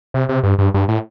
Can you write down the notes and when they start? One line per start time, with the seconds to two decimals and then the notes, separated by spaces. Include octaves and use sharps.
0.14 C3
0.29 C3
0.44 G2
0.59 G2
0.74 G2
0.88 A2